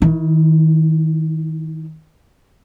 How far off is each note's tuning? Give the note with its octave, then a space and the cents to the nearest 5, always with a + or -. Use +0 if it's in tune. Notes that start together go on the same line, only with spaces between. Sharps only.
D#3 +30 E4 +0